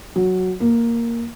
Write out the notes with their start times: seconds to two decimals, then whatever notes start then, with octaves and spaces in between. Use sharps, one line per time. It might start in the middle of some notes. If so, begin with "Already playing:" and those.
0.16 F#3
0.60 A#3